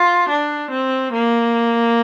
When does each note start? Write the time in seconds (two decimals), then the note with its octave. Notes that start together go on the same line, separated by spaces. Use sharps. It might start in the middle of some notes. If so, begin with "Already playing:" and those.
Already playing: F4
0.29 D4
0.71 C4
1.13 A#3